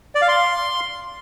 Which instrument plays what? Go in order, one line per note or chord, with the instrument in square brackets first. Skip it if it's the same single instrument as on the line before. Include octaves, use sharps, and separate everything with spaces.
[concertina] D5
F5
C6